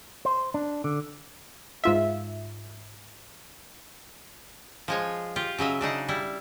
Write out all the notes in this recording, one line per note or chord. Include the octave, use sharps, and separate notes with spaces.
C5
D4
D3
G#2 F4 E5
F3 G#3 C#5
F4 G4
C#3 F#3 D#5 E5
C#3 D4 D#4 F#5
G3 E4